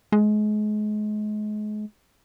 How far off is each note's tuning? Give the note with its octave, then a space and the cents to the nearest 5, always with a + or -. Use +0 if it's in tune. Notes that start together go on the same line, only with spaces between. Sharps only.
G#3 +35